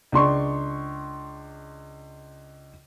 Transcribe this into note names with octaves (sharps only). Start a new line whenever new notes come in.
C#2 D4 C6 C#6